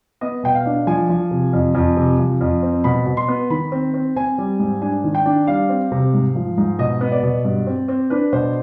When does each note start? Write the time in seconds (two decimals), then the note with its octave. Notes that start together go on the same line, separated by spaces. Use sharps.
0.21 B3 D#5
0.43 B2 G5
0.55 F5
0.66 D4
0.87 F3 G#5
1.09 F3
1.31 C3
1.53 F2
1.75 F2
1.97 C3
2.19 F3
2.41 F2
2.63 C4
2.84 B2 B5
3.06 B2
3.17 C6
3.28 B3
3.50 D#3 B5
3.72 C4
3.94 C4
4.16 C4 G#5
4.38 G3
4.59 G#2
4.81 D4 G#5
5.04 D#3
5.15 G5
5.25 D4
5.47 G3 F5
5.69 C4
5.92 C3
6.13 G#2
6.36 F3
6.57 G#2
6.79 B2 D#5
7.01 B3
7.12 D5
7.23 B2
7.45 G2
7.67 C4
7.88 C4
8.10 D4 B4
8.33 B2 C5